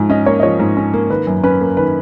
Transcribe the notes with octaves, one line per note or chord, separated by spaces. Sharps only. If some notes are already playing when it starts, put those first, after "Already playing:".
Already playing: G#2 F3 G#5
C#4 D#5
A#3 C#5
D#5
F3 C#5
G#2
C#4
A#3
D#3 B4
F#2
C#4 B4
A#3
D#3 B4